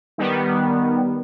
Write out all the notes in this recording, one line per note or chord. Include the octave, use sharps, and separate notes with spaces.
D#3 G3 B3